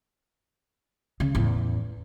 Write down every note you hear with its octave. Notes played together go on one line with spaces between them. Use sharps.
C#3
E2 A2